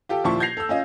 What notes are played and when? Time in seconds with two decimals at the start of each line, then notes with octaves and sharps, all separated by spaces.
0.09 F4 G4 A4 G5
0.24 D#2 A#2 F3 E4 A5 C#6
0.40 G6 G#6 A#6 C7 F7
0.57 A4 E6
0.69 C#4 F4 D#5